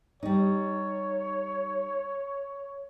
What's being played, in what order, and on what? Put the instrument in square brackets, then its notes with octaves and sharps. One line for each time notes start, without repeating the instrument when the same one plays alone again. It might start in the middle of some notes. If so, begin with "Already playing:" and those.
[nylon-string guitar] G3 D#4 [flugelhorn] C#5